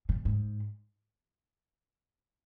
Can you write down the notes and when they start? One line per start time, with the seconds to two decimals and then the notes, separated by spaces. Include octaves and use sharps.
0.09 A#2
0.25 G#2